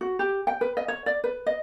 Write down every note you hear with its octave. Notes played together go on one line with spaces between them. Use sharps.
F#4
G4
G5
B4
D#5
C#5
D5
B4
D#5